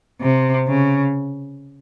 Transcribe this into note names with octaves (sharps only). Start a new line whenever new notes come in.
C3
C#3